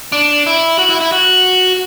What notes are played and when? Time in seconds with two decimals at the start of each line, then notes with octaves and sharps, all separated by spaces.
0.12 D4
0.46 E4
0.79 F#4
0.90 E4
1.01 E4
1.12 F#4